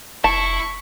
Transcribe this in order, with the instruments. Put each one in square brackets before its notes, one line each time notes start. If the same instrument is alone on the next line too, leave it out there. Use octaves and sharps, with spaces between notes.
[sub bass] F1 [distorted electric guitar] E4 [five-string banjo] A5 [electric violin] C#6